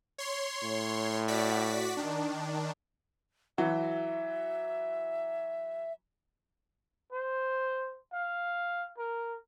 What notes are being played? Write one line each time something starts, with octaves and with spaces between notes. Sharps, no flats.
C#5 C6
A2
F#4 D5 B6
D#3 D4
E3 F#3 F#4 E5
C5
F5
A#4